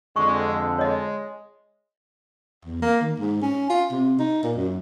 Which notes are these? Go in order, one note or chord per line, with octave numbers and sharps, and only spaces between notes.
F2 D3 G#3 C#6
G#3 C#5 D#5
E2
A#3
D#3
G#2
C#4
F4
C3
D#4
A#2
F#2